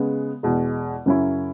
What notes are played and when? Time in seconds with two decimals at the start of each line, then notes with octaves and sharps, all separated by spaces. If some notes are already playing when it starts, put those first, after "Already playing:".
Already playing: C#3 G#3 B3
0.43 E2 B2 G#3
1.06 F#2 C#3 F#3 C#4 E4